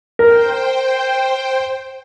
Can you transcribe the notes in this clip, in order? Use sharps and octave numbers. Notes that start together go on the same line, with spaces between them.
A#4 C5 G5